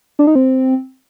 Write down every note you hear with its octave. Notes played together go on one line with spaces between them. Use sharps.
D4
D#4
C4